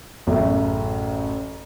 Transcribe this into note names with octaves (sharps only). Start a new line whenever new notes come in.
A1 F#2 C#3 A3 E5